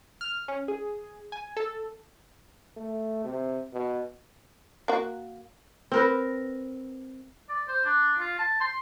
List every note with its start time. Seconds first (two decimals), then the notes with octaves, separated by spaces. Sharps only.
0.21 F6
0.48 C#4
0.68 G#4
1.32 G#5
1.57 A4
2.76 A3
3.24 C3
3.73 B2
4.88 A#3 F#4
5.92 C4 A#4 B4
7.49 D5
7.68 C5
7.85 D4
8.19 F4
8.38 A5
8.61 C6